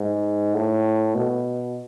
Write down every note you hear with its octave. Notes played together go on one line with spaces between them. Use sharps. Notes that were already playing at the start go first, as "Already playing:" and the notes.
Already playing: G#2
A2
B2